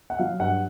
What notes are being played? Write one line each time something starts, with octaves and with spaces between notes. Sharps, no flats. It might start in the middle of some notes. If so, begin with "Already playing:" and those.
F#5
F#3 F5
G2 F#5